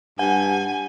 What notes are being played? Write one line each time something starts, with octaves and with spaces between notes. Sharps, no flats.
G2 F#5 G#5